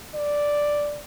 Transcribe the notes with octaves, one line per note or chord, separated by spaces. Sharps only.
D5